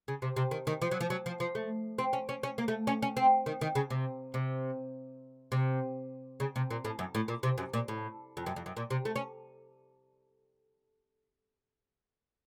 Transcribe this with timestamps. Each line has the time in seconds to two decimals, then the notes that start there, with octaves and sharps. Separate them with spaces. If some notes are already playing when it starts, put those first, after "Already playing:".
0.08 C#3
0.22 C3
0.36 C3
0.51 D#3
0.67 D#3
0.82 F3
0.91 F#3
1.01 F3
1.10 F#3
1.26 F3
1.40 F3
1.55 A3
1.98 C4
2.13 C#4
2.29 C#4
2.43 C#4
2.58 A#3
2.68 A3
2.87 C#4
3.02 C#4
3.17 C4
3.46 D#3
3.61 D#3
3.75 C#3
3.90 C3
4.34 C3
5.52 C3
6.40 C#3
6.56 C3
6.71 A#2
6.85 A2
6.99 F#2
7.15 A2
7.28 A#2
7.43 C3
7.58 F#2
7.73 A#2
7.88 A2
8.37 F2
8.46 F#2
8.56 F2
8.66 F#2
8.77 A#2
8.90 C3
9.05 A3
9.16 C#4